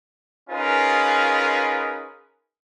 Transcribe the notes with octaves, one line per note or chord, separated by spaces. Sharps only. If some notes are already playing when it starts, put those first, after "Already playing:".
C#4 D#4 F4 G#4 A#4 B4